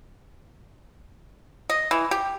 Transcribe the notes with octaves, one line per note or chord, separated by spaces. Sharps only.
D#5
E3
G4